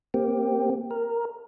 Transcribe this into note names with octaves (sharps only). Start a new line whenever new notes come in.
A#3 C4 G4
A#4